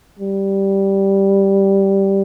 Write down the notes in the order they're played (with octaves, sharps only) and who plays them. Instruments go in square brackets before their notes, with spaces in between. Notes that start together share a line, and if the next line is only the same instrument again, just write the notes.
[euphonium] G3